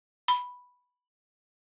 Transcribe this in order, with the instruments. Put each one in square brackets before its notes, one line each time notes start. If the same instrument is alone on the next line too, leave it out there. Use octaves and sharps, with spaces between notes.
[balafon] B5